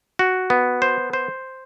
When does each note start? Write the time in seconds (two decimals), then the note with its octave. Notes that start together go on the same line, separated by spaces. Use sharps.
0.19 F#4
0.50 B3
0.82 C5
1.13 C5